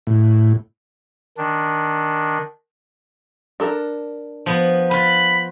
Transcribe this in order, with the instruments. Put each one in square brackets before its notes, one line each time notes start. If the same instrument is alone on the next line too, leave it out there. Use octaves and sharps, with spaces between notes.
[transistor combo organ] A2
[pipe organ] D#3 D4
[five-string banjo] D4 A4 A#4
[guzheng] F3 B3
[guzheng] F4 B4 [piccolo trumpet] B5